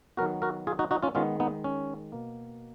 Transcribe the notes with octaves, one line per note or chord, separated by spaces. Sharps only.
D#3 F#3 B3 F#4 A#4
F#4 A#4
F4 G#4
D#4 F#4
D#4 F#4
C#4 F4
D#3 G#3 B3 C#4 F4
B3 D#4
C#4
B2 A#3